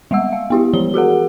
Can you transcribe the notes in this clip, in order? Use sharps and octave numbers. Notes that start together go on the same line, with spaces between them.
G3 G#3 E5 F#5 E6
F5
B3 E4 G4
E3 F3 G4 G7
F#4 G#4 A#4 F#5